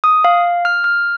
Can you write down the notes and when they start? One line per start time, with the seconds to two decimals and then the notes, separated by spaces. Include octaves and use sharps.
0.04 D#6
0.24 F5
0.65 F6
0.84 F6